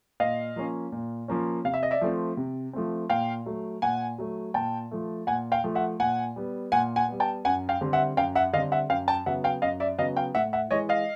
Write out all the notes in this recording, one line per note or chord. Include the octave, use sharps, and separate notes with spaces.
A#2 D#5 F5
F3 A#3 C#4
A#2
F3 A#3 C#4
C3 F5
E5
D#5
D5 E5
F3 A3 C4
C3
F3 A3 C4
A#2 F5 G5
F#3 A3
A#2 F#5 G#5
F#3 A3
A#2 G5 A5
F3 A3
A#2 F#5 G#5
F5 G5
F3 A3
E5 F#5
A#2 F#5 G#5
G3 B3
A#2 F#5 G#5
F#5 G#5
G3 B3
G5 A5
F#2 F#5 G#5
F5 G5
D3 G3 C4
E5 F#5
F#2 F5 G5
E5 F#5
D3 G3 C4 D#5 F5
E5 F#5
F#2 F5 G5
G5 A5
C#3 F#3 B3 E5 F#5
F5 G5
F#2 D#5 F5
D5 E5
C#3 F#3 B3 D#5 F5
F5 G5
A2 E5 F#5
E5 F#5
E3 G#3 C#5 D#5
D#5 F5